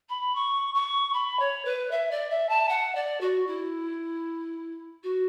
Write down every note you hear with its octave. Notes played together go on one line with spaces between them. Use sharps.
B5
C#6
C#6
B5
C#5
B4
E5
D5
E5
A5
F#5
D5
F#4
E4
F#4